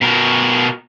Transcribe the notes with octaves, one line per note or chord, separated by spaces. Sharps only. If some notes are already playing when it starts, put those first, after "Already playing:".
B2 A#4